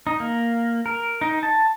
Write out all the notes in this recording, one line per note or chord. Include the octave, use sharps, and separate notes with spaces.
D#4
A#3
A#4
D#4
A5